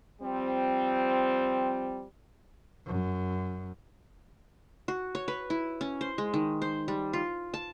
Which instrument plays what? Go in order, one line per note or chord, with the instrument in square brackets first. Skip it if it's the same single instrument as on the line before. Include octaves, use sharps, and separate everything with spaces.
[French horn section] F3 G3 C4
[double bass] F#2
[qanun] F#4
C#5
B4
E4
C#4
C5
G#3
D#3
C5
G3
F4
A5